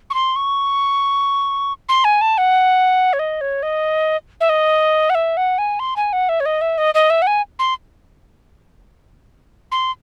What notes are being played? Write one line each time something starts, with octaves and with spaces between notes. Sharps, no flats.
C#6
C6
C#6
C6
G#5
A5
F#5
C#5
D#5
C#5
D#5
E5
D#5
F#5
E5
F#5
G#5
C6
G#5
F#5
E5
C#5
D#5
E5
D#5
D#5
E5
F#5
G#5
C6
C6